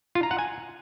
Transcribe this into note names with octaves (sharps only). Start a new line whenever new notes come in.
F4
A#5
F#5
G#5